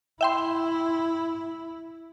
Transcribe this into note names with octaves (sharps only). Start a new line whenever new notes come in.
E4 E5 G5 C6